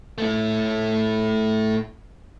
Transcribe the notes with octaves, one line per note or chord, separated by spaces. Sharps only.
A3 E4